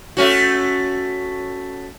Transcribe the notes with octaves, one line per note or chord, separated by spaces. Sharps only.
A3 C#4 F#4